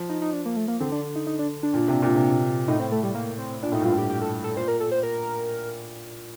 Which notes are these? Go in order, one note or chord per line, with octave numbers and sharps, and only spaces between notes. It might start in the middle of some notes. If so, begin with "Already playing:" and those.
Already playing: F3
D#4
D#4
D4
A#3
A3
A#3
D3 C4
D4
D#4
D#4
D4
D4
A#2
C3
A#2
C3
A#2
A2 D#4
C4
A3
G3
A#3
C4
A#2 D4
A2 D#4
G2 F4
A2
G4
G4
A4
A4
A#2 C5
A#4
A4
C5
A#4